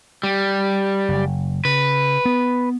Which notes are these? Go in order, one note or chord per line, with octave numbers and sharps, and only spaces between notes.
G3
F#1
C#3 B4
B3